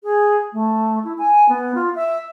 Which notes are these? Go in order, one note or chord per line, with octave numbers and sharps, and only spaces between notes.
G#4
A3
E4
G#5
B3
F4
E5